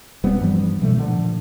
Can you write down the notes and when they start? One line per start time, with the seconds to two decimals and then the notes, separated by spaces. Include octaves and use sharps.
0.24 D#1 G3 B3 C4
0.40 G2 E3 F3 G3
0.82 B2 F3 G3 A3
0.97 A#2 D3 F3